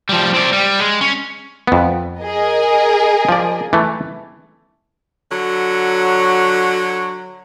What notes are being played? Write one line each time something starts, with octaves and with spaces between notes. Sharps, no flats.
F3 G3
C4 D5
G3
G#3
C#4
F2 B3
G#4 A#4 D#5
F3 D5
E3 A3
D3 F#3